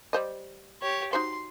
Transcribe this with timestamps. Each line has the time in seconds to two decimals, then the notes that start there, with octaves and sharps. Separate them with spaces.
0.13 G3 C5 D#5
0.82 G4 C#5
1.13 D#4 F#4 C5 C6